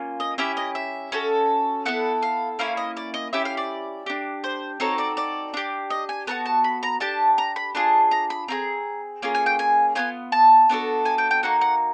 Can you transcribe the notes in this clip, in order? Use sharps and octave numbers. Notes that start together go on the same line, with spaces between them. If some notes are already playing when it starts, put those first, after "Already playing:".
Already playing: A#3 C#4 F4
D#5
C#4 E4 G4 E5
D#5
E5
C#4 F#4 A4
B3 E4 A4 F#5
F5
A#3 C#4 E4 F5
D#5
D5
D#5
C#4 E4 G4 E5
F5
D5
D4 G4
C5
C4 D#4 F#4 A4 C#5
D5
D5
D4 G4
D#5
G#5
B3 D#4 F#4 A5
A5
B5
A#5
D4 G4 A5
A#5
B5
D4 F4 G#4 A5
A#5
B5
C4 F4 G#4 A#5
A#3 C#4 F4 G#4
G#5
G5
G#5
B3 D4 F4 G#5
A5
B3 D4 F#4 A4
G#5
G5
G5
A#3 D#4 F#4 F#5
F#5